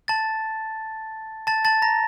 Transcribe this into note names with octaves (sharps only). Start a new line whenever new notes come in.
A5 A6
A5 A6
A5 A6
A#5 A#6